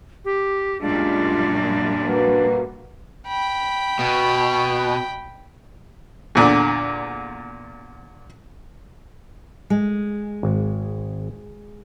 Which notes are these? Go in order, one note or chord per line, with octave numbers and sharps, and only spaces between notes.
G4
F#2 A#2 G3 G#3 D4 F4
A#3 F#4 B4
G5 B5
B2
E2 A#2 D3
G#3
G#1